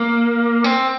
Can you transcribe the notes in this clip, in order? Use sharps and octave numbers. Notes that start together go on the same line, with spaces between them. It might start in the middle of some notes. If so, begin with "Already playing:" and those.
Already playing: A#3
C4